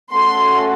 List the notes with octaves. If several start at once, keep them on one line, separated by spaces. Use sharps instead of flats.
A3 C#4 F#4 A4 C6